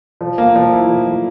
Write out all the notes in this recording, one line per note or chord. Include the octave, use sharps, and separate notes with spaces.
F3
A#3
F3
E4
F3
F3